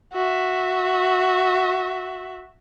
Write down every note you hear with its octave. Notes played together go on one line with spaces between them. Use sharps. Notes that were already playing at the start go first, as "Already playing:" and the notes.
F#4 E5